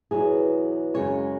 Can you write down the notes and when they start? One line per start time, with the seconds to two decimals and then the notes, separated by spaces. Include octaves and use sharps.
0.11 E2 B2 F#3 G#4
0.94 F#2 C#3 G#3 C#5